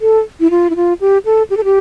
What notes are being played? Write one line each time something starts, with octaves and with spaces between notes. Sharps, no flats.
A4
E4
F4
E4
F4
G4
A4
G4
A4
G4